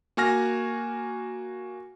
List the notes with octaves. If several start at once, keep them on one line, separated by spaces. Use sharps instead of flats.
A#3 F#4 G#5 F6 A#6